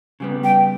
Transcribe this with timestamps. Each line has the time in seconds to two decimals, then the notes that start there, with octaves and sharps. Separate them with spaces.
0.20 C#3 G3 B3
0.44 G5